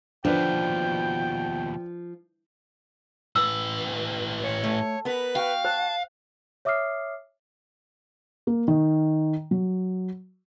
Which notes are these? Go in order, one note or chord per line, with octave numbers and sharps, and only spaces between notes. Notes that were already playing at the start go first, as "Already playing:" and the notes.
D#2 B2 D3 F3 D4 B4 G5
A2 B4 E6
C#5
A3
B3 A#4 B4
F#4 F5 G5
C5 A5
C#5 E5 D6 D#6 F6 C7
A#3
D#3
F#3